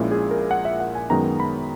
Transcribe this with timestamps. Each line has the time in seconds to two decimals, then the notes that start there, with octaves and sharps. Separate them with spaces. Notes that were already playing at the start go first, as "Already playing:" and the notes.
Already playing: A#1 A#2 G#3 C#4 E4
0.11 G#4
0.31 A#4
0.51 F#5
0.65 E5
0.80 F#5
0.95 G#5
1.10 F#2 D#3 G#3 B3 A#5
1.40 B5